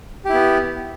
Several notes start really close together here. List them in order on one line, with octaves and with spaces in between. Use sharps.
G4 E4 B3